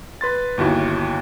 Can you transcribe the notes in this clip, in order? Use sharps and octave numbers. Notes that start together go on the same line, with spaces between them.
B4 C6 A6
G1 D#2 E4 F#4